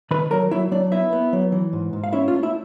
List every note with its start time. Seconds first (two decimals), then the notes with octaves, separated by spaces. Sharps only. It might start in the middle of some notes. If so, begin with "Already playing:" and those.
0.11 D#3 B4 B5
0.31 F#3 A#4 A#5
0.51 F#3 E4 E5
0.71 F#3 D4 D5
0.92 B3 E4 E5
1.13 B3
1.33 F#3
1.52 E3
1.73 G#2
1.93 G#2
2.04 F5
2.13 C#4 E4 E5
2.28 F4 F5
2.34 A3
2.43 E4 E5